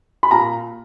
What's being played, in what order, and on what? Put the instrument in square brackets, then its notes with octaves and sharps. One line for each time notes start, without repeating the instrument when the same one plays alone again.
[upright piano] B5
A#2 A#5